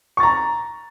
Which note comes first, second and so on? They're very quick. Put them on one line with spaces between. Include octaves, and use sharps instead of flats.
C#6 A6 A#5